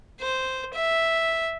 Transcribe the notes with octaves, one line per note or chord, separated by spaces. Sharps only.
C5
E5